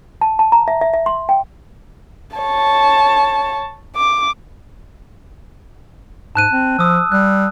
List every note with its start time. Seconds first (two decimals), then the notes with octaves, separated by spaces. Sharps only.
0.21 A5
0.39 A5
0.52 A#5
0.68 E5
0.81 E5
0.94 E5
1.06 C6
1.29 G5
2.37 C#5 A5
3.96 D6
6.35 G#2 A5 F#6 D#7
6.52 C4
6.79 F3 D#6 E6
7.12 G3 F#6